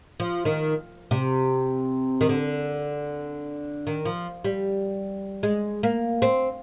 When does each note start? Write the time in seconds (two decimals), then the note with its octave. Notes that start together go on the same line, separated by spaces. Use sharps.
0.20 F3
0.45 D#3
1.11 C3
2.21 D#3
2.29 D3
3.87 D#3
4.05 F3
4.45 G3
5.43 G#3
5.83 A#3
6.22 C4